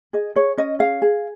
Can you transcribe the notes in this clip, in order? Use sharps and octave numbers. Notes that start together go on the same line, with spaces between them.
G#4 D#5
G#4 C#5
C#4 D#5
G#4 F5
G#4